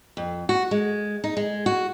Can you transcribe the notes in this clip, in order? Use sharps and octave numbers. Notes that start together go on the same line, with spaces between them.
F2
F#4
G#3
D#4
G#3
F#4